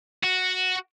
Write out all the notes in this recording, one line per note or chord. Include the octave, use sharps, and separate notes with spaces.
F#4